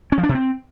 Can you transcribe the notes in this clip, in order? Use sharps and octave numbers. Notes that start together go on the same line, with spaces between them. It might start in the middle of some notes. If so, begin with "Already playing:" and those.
C#4
F3
D4
C3
C4